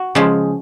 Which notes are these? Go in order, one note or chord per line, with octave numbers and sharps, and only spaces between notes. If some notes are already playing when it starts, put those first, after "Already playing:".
Already playing: F#4
C#3 F3 G#3